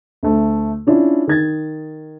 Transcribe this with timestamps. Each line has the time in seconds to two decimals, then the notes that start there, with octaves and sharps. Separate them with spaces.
0.23 D2 A3
0.87 C#4 D4 E4 F4
1.27 D#3 G#6 A6